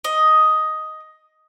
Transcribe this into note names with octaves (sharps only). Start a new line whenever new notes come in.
D#5